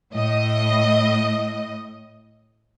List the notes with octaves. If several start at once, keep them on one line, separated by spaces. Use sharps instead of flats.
A2 D#5